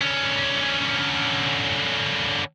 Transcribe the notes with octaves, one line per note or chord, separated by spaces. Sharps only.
D3 C#4